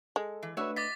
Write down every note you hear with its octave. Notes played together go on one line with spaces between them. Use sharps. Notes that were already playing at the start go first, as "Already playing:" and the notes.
G#3 A4
E3
A3 D4 F#4 B4 C#5 E5
D#5 D6 A6 B6